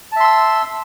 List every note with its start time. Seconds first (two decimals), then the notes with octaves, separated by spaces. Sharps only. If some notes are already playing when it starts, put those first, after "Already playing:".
0.12 A5
0.16 E5
0.20 C6
0.24 E6